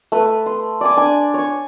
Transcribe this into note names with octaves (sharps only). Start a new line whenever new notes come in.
A3 B4
C6
D5 G#5 D6
D4 G#5
C#5 C#6